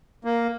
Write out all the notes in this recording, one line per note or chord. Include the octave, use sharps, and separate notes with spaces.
A#3